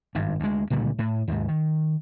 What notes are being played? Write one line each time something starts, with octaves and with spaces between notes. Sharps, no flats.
G#1 G2
D2 G#3
C#2 A#2 D3 G3
A2
D#2 G#2
D#3